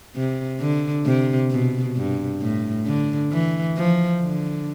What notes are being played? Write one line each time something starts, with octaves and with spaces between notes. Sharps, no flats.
C3
D3
C3
B2
G2
A2
D3
E3
F3
D3